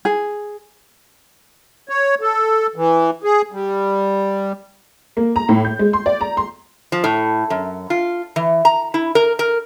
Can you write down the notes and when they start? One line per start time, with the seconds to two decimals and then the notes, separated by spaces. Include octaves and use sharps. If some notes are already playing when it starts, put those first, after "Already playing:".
0.05 G#4
1.89 C#5
2.21 A4
2.76 E3
3.24 G#4
3.52 G3
5.17 A#3
5.36 A#5
5.49 A2
5.65 G6
5.79 G#3
5.93 C6
6.06 D5
6.21 A#5
6.37 C6
6.92 F3
7.04 A2
7.50 F#2
7.90 F4
8.36 E3
8.65 A#5
8.94 E4
9.15 A#4
9.39 A#4